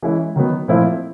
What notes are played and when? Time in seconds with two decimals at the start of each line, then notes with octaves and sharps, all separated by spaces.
0.02 E3 G#3 C#4 E4
0.36 D#3 F#3 B3
0.68 A#2 F3 A3 C4 E4